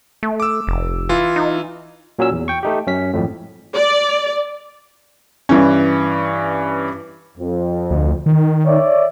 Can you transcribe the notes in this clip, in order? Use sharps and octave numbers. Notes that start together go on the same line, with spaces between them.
A3
D6 E6
F1
E3 F4
D#4
A#2 F#3 C#4 E6
E2
G5 C#6
A3 D#4 G4
F#2 C#4 B6
G#1 F2 A2
D5
G2 E3 C#4
F2
D2
D#3
C#5 D5 E5